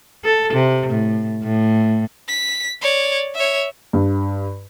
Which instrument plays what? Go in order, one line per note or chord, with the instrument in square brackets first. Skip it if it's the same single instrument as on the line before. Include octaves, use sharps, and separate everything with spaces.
[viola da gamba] A4
C3
A2
A2
[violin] B6
C#5 D5
C#5 E5
[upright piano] G2